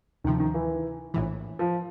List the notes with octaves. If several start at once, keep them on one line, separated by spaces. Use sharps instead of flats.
D2 C3 D#3 F3
D#3
E3
A#1 A2 E3
F3